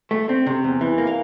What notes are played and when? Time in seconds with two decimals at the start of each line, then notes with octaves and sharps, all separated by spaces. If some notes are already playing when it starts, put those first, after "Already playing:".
0.11 A3
0.29 C4
0.46 C3
0.64 E2
0.81 E3
0.98 A#3
1.07 F5